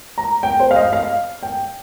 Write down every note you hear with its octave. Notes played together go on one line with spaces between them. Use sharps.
A#5
G5
C5
F5
D#5
F5
G5